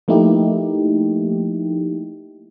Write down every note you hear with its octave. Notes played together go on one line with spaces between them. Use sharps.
F3 A3 A#3 D#4 E4 G4